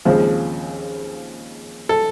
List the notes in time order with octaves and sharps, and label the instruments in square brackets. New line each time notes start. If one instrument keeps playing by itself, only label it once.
[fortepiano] D#2 C#3 F3 G#3 C4
A4